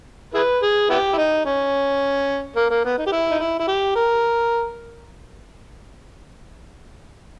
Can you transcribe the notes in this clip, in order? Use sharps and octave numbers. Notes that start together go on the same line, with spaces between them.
E4 G#4 B4
G#4
B3 E4 G4
E4
D#4
C#4
A#3
A#3
B3
D#4
G4
E4
D#4
E4
E4
G4
A#4